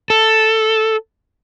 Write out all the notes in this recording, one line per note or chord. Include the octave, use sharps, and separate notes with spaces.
A4